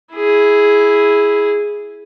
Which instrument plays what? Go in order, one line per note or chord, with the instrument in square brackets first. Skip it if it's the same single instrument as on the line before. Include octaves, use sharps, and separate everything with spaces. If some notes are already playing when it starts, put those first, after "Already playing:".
[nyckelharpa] E4 G#4